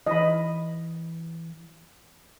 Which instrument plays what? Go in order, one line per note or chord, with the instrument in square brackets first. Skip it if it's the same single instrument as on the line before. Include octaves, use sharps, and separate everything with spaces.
[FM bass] E3 [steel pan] D#5 B5